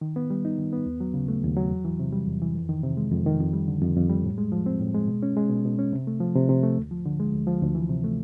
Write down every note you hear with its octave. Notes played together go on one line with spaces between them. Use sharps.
D#3
B3
G3
D#4
D#3
B3
D#2
F#3
C#3
A3
D#2
F#3
E2
E3
C3
G3
E2
E3
F2
D#3
C3
G#3
F2
D#3
F2
G3
D3
F2
F2
G3
A2
G#3
F3
C4
A2
G#3
B2
C#4
G#3
B2
B2
C#4
C3
A3
F3
C3
C3
A3
D2
F3
D3
G#3
D2
F3
D2
E3
C3
A3